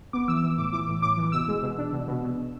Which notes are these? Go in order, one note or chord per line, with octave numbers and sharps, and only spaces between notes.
B3 D6
E3 E6
E3 E6
A2 D6
E3 D6
A2
A2 D6
E3
B2 E6
G#3
B2
D4
B2
B2
B2
B2